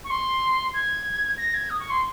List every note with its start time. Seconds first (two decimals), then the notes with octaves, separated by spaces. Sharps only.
0.04 C#6
0.10 C6
0.73 G#6
1.37 A#6
1.54 G#6
1.70 D#6
1.79 C#6
1.90 C6